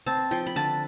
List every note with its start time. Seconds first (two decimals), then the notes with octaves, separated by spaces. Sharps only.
0.06 C4 A5
0.31 F3 G5
0.46 B5
0.56 D3 A5